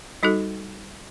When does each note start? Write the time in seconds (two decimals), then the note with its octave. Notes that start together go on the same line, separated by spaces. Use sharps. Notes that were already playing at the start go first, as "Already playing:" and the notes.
0.23 G3 D#4 F#4 A4